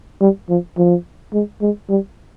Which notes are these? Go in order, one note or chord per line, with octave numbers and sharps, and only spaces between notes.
G3
F3
F3
G#3
G#3
G3